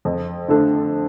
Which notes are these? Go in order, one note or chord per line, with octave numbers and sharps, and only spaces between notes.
F2
D3 A3 D4 A4